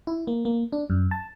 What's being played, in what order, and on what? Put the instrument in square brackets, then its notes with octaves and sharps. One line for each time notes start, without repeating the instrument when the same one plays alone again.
[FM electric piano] E4
A#3
A#3
D4
F#2
A5